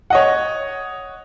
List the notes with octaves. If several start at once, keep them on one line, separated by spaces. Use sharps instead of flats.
C#5 D#5 F#5